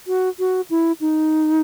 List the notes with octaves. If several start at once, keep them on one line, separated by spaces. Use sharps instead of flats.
F#4
F#4
E4
D#4